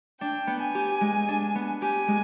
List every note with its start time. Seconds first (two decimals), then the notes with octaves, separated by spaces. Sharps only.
0.20 D4 G5
0.47 B3
0.60 G#5
0.75 G4
1.01 G#3
1.28 D4
1.55 B3
1.82 G4 G#5
2.08 G#3